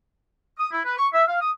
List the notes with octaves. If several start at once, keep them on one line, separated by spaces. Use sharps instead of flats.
D#6
E4
B4
C#6
E5
F5
D#6